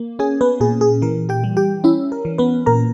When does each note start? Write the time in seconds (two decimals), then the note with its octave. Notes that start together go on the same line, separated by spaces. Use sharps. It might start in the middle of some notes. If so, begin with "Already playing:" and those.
Already playing: A#3
0.19 C#4 G#4 G#5
0.41 B3 B4
0.60 A#2 G#4
0.81 G#4
1.02 E3 A#4
1.29 G4 G5
1.44 G3
1.57 G4 G5
1.84 C#4 E4 E5
2.12 A#4
2.25 E3
2.38 B3 B4
2.66 A#2 A#4 A#5